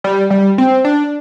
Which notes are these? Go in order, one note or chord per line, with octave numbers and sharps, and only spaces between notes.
G3
G3
C4
D4